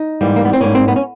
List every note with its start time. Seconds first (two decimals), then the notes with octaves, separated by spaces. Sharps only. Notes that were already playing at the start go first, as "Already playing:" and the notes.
Already playing: D#4
0.21 G#2 E3 G3 A#3
0.36 A#3
0.45 B3
0.53 C4
0.61 G#2 E3 G3 A#3 C#4
0.75 C4
0.88 B3
0.96 C#4